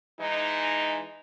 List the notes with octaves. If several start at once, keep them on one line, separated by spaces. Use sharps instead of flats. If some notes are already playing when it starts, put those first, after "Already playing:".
E3 G#3 D#4